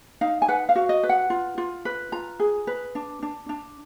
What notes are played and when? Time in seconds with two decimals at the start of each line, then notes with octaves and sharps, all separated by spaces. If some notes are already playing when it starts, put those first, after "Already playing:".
0.21 D#4 F5
0.42 G#5
0.48 B4 F#5
0.69 F5
0.76 F#4
0.89 D#5
1.03 B4
1.09 F#5
1.30 F4
1.58 F4
1.85 B4
2.12 F4 A#5
2.40 G#4
2.67 B4
2.95 D4
3.23 D4
3.49 D4